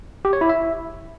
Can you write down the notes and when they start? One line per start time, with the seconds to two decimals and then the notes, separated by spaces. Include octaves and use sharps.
0.25 G4
0.33 C#5
0.41 E4
0.49 E5